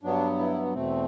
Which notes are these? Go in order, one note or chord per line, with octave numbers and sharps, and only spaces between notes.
G2 F#3 B3 D4
E4
E2 B2 A3 C4